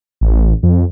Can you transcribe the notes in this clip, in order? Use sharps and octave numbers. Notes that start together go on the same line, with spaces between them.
A1
F2